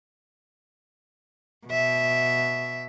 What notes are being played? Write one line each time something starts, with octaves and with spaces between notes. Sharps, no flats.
B2 E5